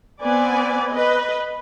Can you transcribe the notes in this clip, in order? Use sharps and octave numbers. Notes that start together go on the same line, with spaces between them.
B3 C4 B4 D5 G#5
B4 D#5